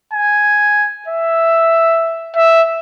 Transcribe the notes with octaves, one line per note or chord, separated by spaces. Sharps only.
G#5
E5
E5